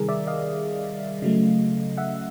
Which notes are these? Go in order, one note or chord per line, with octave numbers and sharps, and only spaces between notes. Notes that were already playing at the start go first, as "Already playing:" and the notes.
Already playing: C3 D#3 G3 G#4 A#4
D5 E5
D#5 F5
C#3 F#3 A3
E5 F#5